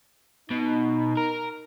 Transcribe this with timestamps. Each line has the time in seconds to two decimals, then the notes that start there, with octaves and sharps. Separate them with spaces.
0.51 B2 D#4
1.17 A#4